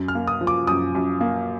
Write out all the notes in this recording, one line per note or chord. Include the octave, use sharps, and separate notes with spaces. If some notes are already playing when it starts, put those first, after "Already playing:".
Already playing: F#2
F6
A#3
D#6
F3
D6
F#2 D#6
F#2
A#3